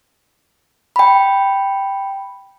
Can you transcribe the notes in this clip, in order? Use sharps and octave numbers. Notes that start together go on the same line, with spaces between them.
G5 B5